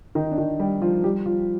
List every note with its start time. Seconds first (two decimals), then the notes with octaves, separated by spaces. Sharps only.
0.15 D#3 D#4
0.32 D4
0.38 D#3 D#4
0.60 G3 G4
0.82 F3 F4
1.04 G3 G4
1.26 F3 F4